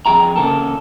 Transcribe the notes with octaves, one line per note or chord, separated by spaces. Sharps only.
F2 G#2 G#4 G5 A#5
C#3 A#3 A4